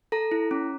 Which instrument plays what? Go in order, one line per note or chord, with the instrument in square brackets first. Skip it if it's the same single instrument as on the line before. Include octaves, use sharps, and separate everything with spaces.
[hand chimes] A4 A#5
E4
C#4